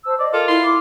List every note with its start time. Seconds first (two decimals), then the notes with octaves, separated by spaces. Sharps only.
0.05 C5 A5 E6
0.19 D5 D#5
0.33 F4 A4 A#4
0.48 E4 C6
0.64 D6